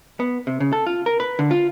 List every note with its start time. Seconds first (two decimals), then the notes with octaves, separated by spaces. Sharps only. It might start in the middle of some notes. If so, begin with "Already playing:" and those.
0.20 B3
0.47 C3
0.60 C#3
0.73 A4
0.86 F4
1.06 A#4
1.20 B4
1.39 D3
1.51 F4